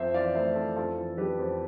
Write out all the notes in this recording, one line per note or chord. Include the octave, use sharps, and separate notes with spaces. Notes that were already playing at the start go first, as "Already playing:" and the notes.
Already playing: F2 C5 E5
E3 D5 F5
A3 C5 E5
F2 F4 A4
F2 F4 A4
E3
G3 G4 B4
F2